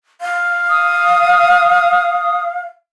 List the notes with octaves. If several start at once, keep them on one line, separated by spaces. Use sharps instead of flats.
F5
D#6